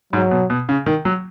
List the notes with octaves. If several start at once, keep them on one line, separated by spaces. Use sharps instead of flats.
G#2 F#3
B2
B2
C#3
D#3
F#3